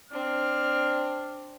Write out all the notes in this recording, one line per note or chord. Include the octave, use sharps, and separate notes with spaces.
C4 D4 F6